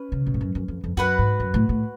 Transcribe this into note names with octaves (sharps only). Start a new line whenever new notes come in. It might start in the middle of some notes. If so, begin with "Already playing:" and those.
Already playing: C#4 B4
C#3
B2
G#2
F#2
F#2
F2
F2
F#2 F#4 B4 F#5
G#2
F#2
A2
A2